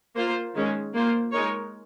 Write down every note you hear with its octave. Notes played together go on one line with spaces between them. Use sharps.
A#3 F4 C5
D#3 G#3 C#4
A#3 F4 C5
G#3 D#4 A#4 C#5